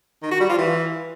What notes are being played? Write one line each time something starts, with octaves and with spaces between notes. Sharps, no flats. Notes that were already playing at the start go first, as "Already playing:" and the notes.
D#3
F#4
G3
F4
E3